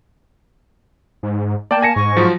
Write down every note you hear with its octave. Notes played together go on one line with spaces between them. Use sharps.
G#2
A#3 D5 G5 A5
G#5 A5 A#6 C#7
G#2 C#6
F3 F#3 F4